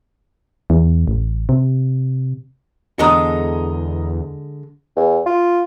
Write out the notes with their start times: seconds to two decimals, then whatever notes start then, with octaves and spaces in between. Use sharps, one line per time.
0.70 E2
1.08 A1
1.49 C3
2.99 E2 D3 G#3 A4 D#5 A#5 D#6
4.96 E2
5.26 F4